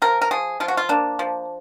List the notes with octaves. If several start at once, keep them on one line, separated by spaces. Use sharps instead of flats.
F3 A#4
A#4
F3 G#4
F3 F4
F#4
F4
A#3 D4
F3